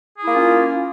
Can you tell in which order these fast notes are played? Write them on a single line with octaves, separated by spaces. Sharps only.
G#4 E4 A#3 F4 C#4